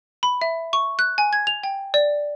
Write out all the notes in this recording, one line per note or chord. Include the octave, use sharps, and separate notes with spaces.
B5
E5
C#6
F#6
G#5
G#6
F7
G5
D5